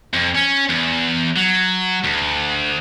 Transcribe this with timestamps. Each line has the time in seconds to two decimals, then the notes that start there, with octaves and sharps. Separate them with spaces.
0.14 F2
0.35 C#4
0.69 E2
1.36 F#3
2.04 D2